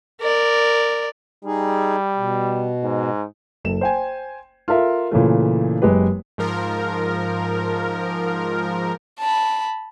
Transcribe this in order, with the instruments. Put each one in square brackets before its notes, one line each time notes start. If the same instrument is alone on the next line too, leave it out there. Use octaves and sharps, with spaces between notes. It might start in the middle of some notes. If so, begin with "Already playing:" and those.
[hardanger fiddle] A#4 D5
[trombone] G3 [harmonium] D#4 G#4
[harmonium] B2
[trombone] G#2
[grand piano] F#1 A4 E7
C5 G5 G#5
F4 A4 A#4 E5
A#2 C#3 E3 A3
F#1 F#2 G#3 G4 B4
[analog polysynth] G#2 F3 A#4
[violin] A5 B5